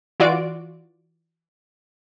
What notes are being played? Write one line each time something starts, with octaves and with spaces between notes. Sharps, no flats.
E3 F4 F#4 D5 D7